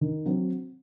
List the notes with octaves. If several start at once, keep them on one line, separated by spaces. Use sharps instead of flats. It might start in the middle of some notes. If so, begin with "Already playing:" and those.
D#3
F#3 C4